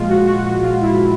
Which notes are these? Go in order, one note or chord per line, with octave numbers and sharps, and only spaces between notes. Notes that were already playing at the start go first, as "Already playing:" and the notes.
Already playing: A#2 F3 G#3 F4
F#4
F#4
F#4
F4
E4